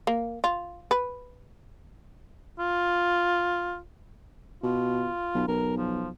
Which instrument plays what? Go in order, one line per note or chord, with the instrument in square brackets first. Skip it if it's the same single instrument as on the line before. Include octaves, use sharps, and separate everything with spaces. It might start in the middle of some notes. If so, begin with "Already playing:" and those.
[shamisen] A#3
F4
B4
[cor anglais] F4
[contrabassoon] B2 [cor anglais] F4
[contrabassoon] B1
[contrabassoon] B1 [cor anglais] A#4
[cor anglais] F3